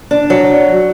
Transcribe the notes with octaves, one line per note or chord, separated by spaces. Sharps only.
D4
F#3